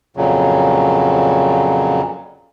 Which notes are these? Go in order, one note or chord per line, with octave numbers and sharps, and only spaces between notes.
F2 A#2 C#3 F#3